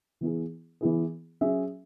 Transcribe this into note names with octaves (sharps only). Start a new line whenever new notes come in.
E3 B3 E4 G#4
E3 B3 E4 G#4
F#3 C#4 G#4 E5